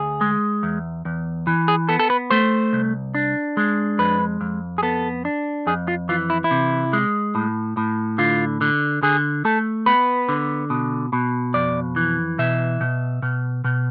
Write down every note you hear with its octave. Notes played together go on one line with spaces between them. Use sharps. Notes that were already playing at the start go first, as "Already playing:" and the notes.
Already playing: D2 G#4
G#3
E2
E2
E3
G#4
B3 A4
A4
B4
A3 C5
C2
D4
G#3
F2 B4
F2
G#4
B3 A4
D4
F2 G#4
F4
E3 F4
E4
E4
C3
G#3
A2
A2
D3 F4
D3
D3 G#4
A3 A4
B3 B4
D3
B2
B2
F2 D5
E3
B2 E5
B2
B2
B2